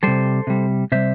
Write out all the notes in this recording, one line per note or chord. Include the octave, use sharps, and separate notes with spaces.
C3 G3 A4 C5
C3 G3
C3 G3 C5 E5